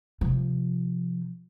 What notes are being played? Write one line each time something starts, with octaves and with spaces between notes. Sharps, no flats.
C3 F3